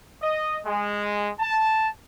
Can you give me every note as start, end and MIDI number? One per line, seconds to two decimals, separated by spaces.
0.21 0.59 75
0.65 1.29 56
1.40 1.87 81